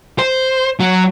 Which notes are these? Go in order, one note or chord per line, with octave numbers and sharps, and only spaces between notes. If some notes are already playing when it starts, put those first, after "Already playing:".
C5
F#3